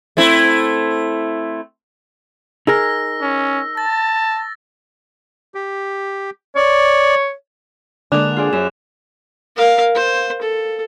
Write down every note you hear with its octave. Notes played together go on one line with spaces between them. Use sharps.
A3 C4 E4
D#4 G#4 A#4 E6 A#6
C#4
A5 A6
G4
C#5 D5
D3 G#3 A#3 D4 D6 F#6 F7
F4 G#4 D5
F#2 E7
A#4 F5
C5
A4